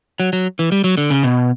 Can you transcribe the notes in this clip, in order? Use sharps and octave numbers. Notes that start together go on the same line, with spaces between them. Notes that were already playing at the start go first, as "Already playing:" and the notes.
F#3
F#3
E3
G3
F#3
D3
C#3
B2